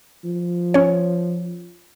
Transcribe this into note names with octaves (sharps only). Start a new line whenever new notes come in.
F3
C#4 C#5